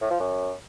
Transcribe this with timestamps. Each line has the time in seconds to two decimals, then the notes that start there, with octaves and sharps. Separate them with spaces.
0.01 A2
0.11 F3
0.20 F#2